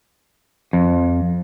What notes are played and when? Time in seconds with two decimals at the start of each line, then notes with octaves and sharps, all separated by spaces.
0.73 F2